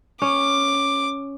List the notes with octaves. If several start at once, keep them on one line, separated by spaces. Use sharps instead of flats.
C#4 D6